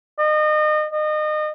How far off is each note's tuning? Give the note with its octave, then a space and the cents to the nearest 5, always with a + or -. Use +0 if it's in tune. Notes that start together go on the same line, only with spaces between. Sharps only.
D#5 -35
D#5 -30